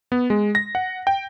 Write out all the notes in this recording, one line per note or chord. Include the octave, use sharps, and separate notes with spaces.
B3
G#3
A#6
F#5
G5